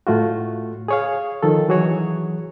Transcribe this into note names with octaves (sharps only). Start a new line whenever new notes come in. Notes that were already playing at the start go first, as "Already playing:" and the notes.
A2 A3 F4 F#4
G#4 C#5 F5
D#3 F3 A4
E3 F#3 F#4 G#4 C#5